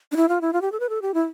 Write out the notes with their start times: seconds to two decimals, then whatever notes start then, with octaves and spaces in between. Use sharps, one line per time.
0.12 D4
0.16 E4
0.29 F4
0.41 E4
0.53 F4
0.62 G4
0.72 A4
0.80 B4
0.89 A4
1.02 G4
1.14 E4